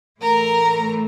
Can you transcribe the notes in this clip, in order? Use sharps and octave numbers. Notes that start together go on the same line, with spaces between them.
A2 E3 A3 A#4 A#5